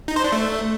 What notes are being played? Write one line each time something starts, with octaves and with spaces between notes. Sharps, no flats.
D#4
C5
D4
A3